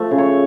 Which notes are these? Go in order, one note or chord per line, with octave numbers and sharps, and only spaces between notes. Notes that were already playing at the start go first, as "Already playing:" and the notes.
Already playing: F3 A3 E5
C#3
C#5